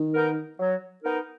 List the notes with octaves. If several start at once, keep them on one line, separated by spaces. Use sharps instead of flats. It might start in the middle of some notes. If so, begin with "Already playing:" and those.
Already playing: D#3
B3 D#4 A#4
F#3
B3 D#4 A#4